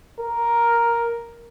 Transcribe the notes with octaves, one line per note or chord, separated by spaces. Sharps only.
A#4